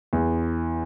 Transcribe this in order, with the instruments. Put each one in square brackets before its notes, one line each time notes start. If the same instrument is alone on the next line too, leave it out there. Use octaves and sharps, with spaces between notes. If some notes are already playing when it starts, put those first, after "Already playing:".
[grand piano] E2